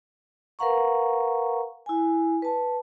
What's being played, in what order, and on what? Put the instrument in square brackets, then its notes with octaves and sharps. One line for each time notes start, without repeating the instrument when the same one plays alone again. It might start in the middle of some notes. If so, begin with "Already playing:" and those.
[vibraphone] A#4 B4 F5 F#5 A#5 C#6
E4 G#5
B4 A5